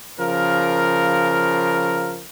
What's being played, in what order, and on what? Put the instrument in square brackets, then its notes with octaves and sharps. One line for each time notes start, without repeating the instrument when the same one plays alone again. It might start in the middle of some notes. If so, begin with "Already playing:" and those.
[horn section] C#3 F3 A#4